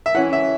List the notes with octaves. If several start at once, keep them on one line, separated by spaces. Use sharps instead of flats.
E5
E3 C#4 E4 F#5
E5